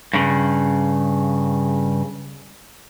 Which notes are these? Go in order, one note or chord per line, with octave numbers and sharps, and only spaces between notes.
G2 C#3